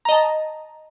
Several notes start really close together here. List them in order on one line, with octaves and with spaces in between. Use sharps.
A#5 D#5 A5